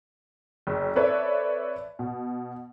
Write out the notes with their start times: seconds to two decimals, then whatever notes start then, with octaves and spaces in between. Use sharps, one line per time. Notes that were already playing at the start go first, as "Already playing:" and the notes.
0.67 F#1
0.96 C4 A4 B4 C#5 D5 E5
1.99 B2